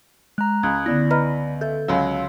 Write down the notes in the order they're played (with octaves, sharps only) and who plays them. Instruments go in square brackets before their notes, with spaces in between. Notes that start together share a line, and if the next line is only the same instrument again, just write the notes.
[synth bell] G#3 [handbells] A#5 F#6
[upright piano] C#2 [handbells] D#6 F#6 G#6
[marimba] D3 B3 [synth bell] E4 [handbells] D5 A#6
[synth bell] B4 D#5 [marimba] A#5 B5 F6
[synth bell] A4 [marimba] E5 [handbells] G6
[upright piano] C#2 F#3 [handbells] F5 [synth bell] C6 E6